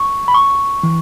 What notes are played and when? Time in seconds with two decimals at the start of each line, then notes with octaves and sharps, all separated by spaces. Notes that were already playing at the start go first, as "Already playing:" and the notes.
Already playing: C#6
0.28 B5
0.34 C#6
0.83 E3